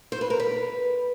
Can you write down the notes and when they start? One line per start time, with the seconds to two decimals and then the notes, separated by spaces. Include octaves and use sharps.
0.12 C5
0.21 B4
0.30 A#4
0.40 B4